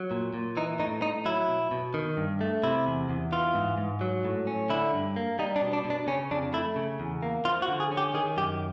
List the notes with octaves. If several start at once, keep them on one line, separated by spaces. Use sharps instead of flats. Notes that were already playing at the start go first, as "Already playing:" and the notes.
Already playing: F#3
A#2
A#2
E3 D#4
A2 D#4
A2 D#4
F#3 E4
B2
B2
D#3
G2
A3
C3 E4
E2
E2
E3 F4
G#2
G#2
F#3
A2
C#4
D3 E4
G2
A#3
G3 D#4
D4
B2
D4
B2
D4
C#3 C#4
F2 D4
A3 E4
C#3
E2
A#3
F3 F4
F#4
D3
G#4
C#4
G4
D#3 G#4
F#2 G4